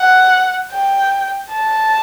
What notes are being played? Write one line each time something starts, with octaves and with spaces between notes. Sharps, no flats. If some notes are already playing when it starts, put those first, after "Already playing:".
Already playing: F#5
G5
A5